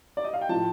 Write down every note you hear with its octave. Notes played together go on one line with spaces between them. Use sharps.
D5
D#5
F5
G5
A2 F3 A5